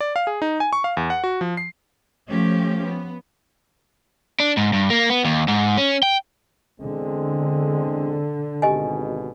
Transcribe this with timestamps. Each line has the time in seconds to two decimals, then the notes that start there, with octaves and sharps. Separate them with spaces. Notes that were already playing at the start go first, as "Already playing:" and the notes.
0.01 D5
0.16 F5
0.27 G#4
0.42 D#4
0.60 G#5
0.73 C#6
0.84 F5
0.97 E2
1.10 F#5
1.24 F#4
1.41 F3
1.57 C7
2.29 F3 A3 C#4 G4
2.84 B3
4.40 D4
4.57 G#2
4.73 G2
4.90 A#3
5.10 B3
5.25 D#2
5.48 G#2
5.78 C#4
6.03 G5
6.80 E2 D3 G#3 C4
8.62 G#1 B2 G4 D#5 G#5